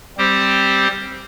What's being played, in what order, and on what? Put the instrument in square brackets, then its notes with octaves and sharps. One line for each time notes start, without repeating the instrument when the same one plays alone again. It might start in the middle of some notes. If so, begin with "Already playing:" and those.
[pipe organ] G3 C4 G4 C5